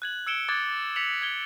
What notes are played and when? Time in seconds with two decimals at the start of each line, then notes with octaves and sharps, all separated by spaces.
0.02 F#6 G#6 F#7
0.27 E6 G#6 C#7 D7 E7 G7
0.49 D6 D#6 F#6 G#6 A6
0.96 E6 B6 C#7 F7 F#7
1.22 G#6 C#7 G7